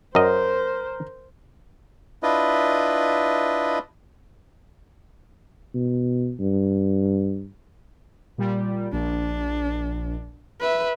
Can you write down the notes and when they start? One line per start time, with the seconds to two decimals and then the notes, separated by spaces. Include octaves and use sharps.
0.15 F#2 A#4 C5 D#5
2.23 D4 E4 F4 B4 D#5
5.74 B2
6.39 G2
8.38 A#2 G3
8.92 A#1 D4
10.61 B4 E5